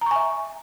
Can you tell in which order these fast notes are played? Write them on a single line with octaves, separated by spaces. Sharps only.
A#5 C#6 G#5 E5